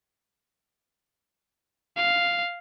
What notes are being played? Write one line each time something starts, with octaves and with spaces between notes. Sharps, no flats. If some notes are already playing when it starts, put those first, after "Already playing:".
F5